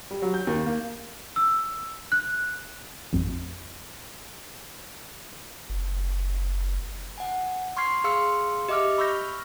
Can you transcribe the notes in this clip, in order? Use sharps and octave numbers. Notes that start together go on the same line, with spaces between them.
G3
F#3
G6
D#2
A#3
E6
F#6
A1 F2
F#1
F#5 G#5
C6 C#6 F6 G#6 C7
G#4 F5 C6 E6 F6 C#7
G4 D#5 E5 D6 E6 F6
B5 C#6 E6 F6 G6 A#6